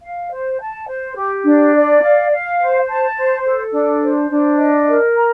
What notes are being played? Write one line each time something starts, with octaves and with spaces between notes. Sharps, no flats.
F5
C5
A5
C5
G4
D4
D5
F5
F5
C5
A5
C5
A4
D4
C5
D4
D#5
A#4
A#5